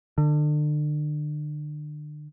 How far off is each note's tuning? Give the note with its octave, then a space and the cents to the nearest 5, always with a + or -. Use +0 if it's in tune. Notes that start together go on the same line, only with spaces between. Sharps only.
D3 +35